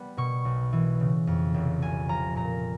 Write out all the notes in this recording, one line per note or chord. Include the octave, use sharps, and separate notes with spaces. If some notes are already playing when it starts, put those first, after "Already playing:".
Already playing: G3 B3
B2 C#6
B1
E3
C#3
F2
F1
C2 G#5
F3 A#5
A#2 A#5